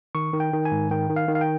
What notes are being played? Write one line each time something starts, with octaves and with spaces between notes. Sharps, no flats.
D#3 C#6
D#3
G5
D#3
G#5
G#2
D#3 G5
D#3
F5
D#3
F5
G5